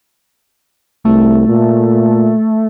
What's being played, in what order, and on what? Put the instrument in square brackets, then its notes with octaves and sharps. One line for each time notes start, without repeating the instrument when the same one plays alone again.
[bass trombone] C2 [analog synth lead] A3
[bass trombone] A#2